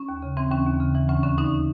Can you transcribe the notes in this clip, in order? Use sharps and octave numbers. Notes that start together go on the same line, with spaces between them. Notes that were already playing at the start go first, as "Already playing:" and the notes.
Already playing: C#4
D#2
C#3
E3 C4
D#2 C#4
D#2
C#3
E3
D2 C#4
D3 C#4
D3 C#4 D#4